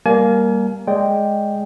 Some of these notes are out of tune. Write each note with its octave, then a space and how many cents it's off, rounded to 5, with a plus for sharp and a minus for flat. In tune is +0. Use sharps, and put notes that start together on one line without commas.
G3 +0 A#3 -5 G#5 +35
G#3 +0 D5 +0 G5 +0